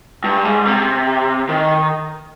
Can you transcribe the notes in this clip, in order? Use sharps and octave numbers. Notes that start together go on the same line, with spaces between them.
G2
G#2
C3
D#3